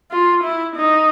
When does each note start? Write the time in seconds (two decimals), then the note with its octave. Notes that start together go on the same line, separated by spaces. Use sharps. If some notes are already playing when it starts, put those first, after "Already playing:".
0.11 F4
0.44 E4
0.76 D#4